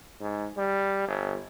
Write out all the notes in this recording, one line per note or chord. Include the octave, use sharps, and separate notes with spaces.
G#2
G3
G1